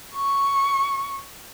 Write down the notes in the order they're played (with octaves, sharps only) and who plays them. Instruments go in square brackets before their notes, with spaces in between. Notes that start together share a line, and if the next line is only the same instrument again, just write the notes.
[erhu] C#6